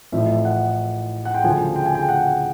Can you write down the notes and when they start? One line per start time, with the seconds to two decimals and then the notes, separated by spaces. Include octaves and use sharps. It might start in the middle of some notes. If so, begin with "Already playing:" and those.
0.12 A1 A2 F3 E5
0.45 F#5
1.25 F#5
1.34 G5
1.43 D2 C#3 F3 G#5
1.76 G5
1.86 G#5
1.95 G5
2.09 F#5